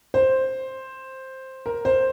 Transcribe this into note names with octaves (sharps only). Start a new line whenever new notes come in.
C5
A#4
C5